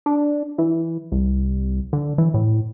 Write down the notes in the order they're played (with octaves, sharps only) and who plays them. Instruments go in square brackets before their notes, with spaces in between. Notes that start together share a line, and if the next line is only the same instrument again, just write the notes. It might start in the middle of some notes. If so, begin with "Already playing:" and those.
[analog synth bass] D4
E3
C2
D3
E3
A2